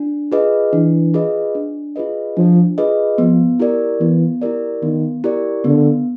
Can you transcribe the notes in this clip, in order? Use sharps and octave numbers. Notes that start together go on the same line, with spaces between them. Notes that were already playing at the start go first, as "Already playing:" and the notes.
Already playing: D4
F4 G#4 B4 D#5
E3 D4
F4 G#4 B4 D#5
D4
F4 G#4 B4 D#5
F3 D4
F4 G#4 B4 D#5
F3 B3
E4 G4 A#4 D5
E3 B3
E4 G4 A#4 D5
D#3 B3
E4 G4 A#4 D5
D3 B3